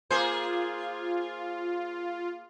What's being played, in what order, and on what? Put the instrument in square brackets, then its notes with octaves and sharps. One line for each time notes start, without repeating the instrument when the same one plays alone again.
[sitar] A#3 G#4 C5 [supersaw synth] F4